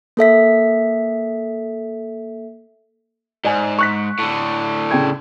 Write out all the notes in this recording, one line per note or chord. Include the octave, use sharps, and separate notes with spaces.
A#3 A4 E5 B6
G#2 D5 G#5
C#6 F#6 B6
A2 D3
C#3 G5 G#6